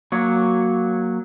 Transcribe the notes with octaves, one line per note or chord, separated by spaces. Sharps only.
F#3 A#3 C#5